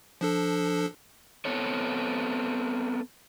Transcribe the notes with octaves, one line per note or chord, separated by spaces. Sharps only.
F3 D4 A4
B3 C4 A4 C#5